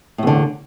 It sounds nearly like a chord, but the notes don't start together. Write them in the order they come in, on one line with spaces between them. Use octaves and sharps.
A2 E2 D3